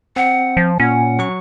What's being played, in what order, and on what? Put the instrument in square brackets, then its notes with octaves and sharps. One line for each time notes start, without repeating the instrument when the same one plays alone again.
[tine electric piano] C4 [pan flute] F#5
[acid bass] F3
[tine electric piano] A#2 [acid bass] C#4 [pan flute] F#5
[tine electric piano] F#3 F#4 C#6